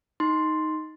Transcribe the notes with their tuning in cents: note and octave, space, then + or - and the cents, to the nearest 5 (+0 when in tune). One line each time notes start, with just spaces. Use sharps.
D#4 +5 C6 +0